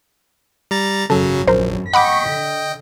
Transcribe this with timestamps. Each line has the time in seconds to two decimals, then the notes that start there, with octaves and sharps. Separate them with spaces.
0.71 G3 A#5 A6
1.10 G#1 F#2 C#3 F#3 A4
1.48 A#1 A#4 C5
1.93 D#5 F#5 G5 B5 C#6 D6 B6
2.32 D3